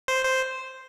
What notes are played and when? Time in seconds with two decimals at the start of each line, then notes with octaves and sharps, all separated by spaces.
0.08 C5
0.25 C5